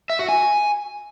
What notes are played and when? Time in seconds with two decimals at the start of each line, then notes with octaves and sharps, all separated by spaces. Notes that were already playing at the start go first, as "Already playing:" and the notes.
0.10 E5
0.19 F#4
0.29 G#5